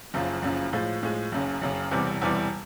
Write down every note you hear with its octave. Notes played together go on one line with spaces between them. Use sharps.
F#1 F#2 C#3 F3
F#1 F#2 C#3 F3
A2 F3 G#3
A2 F3 G#3
F#1 F#2 C#3
F#1 F#2 C#3
E1 E2 C3 E3 G3
E1 E2 C3 E3 G3